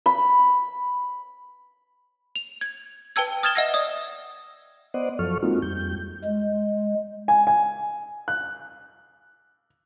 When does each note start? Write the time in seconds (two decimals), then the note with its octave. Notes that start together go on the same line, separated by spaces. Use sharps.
0.06 B5
2.36 F7
2.61 G#6
3.16 B4 G5 A5 E6 G#6
3.43 D#6 F6 G#6 A6 E7 G7
3.55 D#5 E5 F#5 E6 G#6 A#6
3.74 D5 D#6
4.94 B3 C5 D5 D#5 F#5
5.19 F#2 F3 F#3 A4 C#6 F6
5.43 G#3 A#3 C4 D#4 F4 F#4
5.62 F2 G3 G6
6.24 G#3
7.28 G#5
7.47 G#5
8.28 F#6